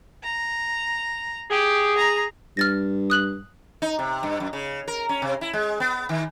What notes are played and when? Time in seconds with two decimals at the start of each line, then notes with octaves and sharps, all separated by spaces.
0.24 A#5
1.51 G4 G#4
1.98 A#5
2.57 G2 F6 A6 A#6
3.10 D#6 F#6 F#7
3.82 D#4
3.99 C3
4.23 G2
4.40 F#2
4.53 C#3
4.88 A#4
5.09 C#4
5.22 C3
5.41 E4
5.53 G#3
5.80 B3
6.09 D#3